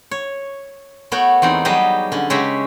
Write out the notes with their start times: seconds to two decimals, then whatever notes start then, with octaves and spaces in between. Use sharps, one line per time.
0.11 C#5
1.12 A3 B3 F#4 C#5 F#5 G5
1.42 E2 C4 D#4 F#5
1.65 F#3 G3 B3 G4 G#4 D#5
2.12 D3 C#4
2.30 C#3 G#3 G4 C#5 E5 A#5